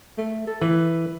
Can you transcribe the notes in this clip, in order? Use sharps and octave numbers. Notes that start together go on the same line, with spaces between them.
A3
A4
E3 B4